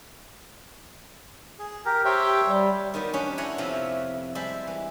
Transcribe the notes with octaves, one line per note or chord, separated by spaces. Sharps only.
G#4
G4 A#4
G4 C5 C#5 E5 G5
G3
D#3 F#3 G3 B3
C#4 D4 G4 B4 C#5 D#5
E4 C#5 F#5 G#5 A#5 C6
F2 C3 F3 B3 E4
G3 G#3 C5 E5 A5 B5
E3